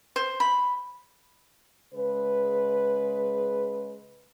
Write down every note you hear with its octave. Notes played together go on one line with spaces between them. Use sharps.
C5
B5
C#3 G#3 B4